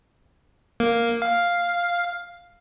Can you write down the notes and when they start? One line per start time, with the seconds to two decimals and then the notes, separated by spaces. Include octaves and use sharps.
0.80 A#3
1.22 F5